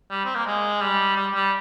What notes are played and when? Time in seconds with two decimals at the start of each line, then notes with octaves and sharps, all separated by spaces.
0.11 G3
0.25 C4
0.35 A#3
0.46 G#3
0.81 G3
1.16 G3
1.35 G3